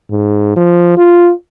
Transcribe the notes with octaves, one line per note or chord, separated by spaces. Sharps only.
G#2
F3
F4